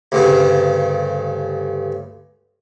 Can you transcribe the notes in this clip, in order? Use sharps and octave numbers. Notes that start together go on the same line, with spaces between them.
D2 G2 C#3